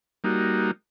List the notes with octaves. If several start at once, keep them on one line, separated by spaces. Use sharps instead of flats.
G3 A#3 D#4 F#4